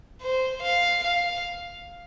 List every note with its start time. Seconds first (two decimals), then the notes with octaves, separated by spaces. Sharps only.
0.21 C5
0.62 F5
1.04 F5